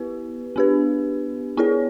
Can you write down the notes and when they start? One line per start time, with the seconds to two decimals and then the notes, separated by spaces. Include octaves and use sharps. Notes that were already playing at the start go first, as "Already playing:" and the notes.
Already playing: B3 E4 G4 B4
0.56 B3 D4 G4 B4
1.57 B3 E4 G#4 C#5